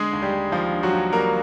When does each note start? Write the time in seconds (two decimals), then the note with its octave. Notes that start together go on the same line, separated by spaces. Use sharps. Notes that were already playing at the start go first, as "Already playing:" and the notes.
Already playing: D3 G#3 G#4
0.13 D#2
0.22 G3 G4
0.33 G3
0.52 D#2 F3 F4
0.72 D3
0.83 F#3 F#4
0.93 D#2
1.13 G3 A#3 A#4